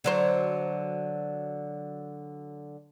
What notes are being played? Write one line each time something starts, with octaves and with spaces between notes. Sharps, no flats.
D3 F#3 C5